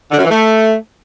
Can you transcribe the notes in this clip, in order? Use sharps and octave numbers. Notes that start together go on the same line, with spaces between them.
D3
F#2
E3
A3